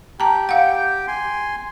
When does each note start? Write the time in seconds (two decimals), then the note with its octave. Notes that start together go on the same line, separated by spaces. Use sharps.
0.20 G4 G5 A5 A#5
0.49 F5 F#5
1.08 G#5 C6